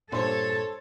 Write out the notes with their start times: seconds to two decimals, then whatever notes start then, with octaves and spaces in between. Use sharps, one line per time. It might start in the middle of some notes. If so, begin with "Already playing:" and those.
0.12 G2 A#2 D4 A4 C5 C#5 C6